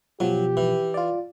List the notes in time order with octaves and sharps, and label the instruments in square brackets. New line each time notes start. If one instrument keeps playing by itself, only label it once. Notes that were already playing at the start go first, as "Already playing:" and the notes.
[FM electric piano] B2 F3 [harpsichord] F#3 [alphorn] G4
[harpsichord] E3
[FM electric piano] F4 D5